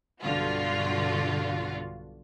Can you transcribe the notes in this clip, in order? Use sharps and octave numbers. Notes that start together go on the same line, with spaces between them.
B1 G2 D3 F4 F#4